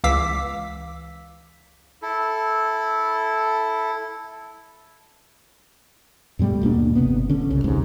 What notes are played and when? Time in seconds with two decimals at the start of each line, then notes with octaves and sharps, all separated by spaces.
0.04 C#2 E3 F5 D6 E6 B6
2.02 E4 A4
6.39 G2 B2 G3 A3
6.61 D#1 B2 A#3 D4
6.95 G1 C3 B3
7.29 D3 C#4
7.50 C2 C#3
7.64 D#1 C2 G#2 C3